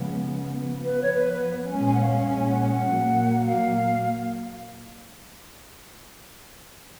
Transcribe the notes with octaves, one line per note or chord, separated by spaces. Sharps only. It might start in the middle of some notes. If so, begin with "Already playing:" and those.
Already playing: C#3 F3 G#3 B3
F3 B3
B4
C#5
B4
B4
A#2 G#3 C#4 G#5
G#5
F#5
F5
G#5
G#5
F#5
F#5
A#2 F#3 A#3
F5